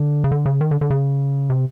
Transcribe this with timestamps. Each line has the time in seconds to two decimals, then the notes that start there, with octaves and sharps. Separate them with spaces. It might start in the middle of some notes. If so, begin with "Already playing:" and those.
Already playing: D3
0.24 C#3
0.32 D3
0.46 C#3
0.61 D#3
0.71 D3
0.81 D3
0.90 C#3
1.50 C3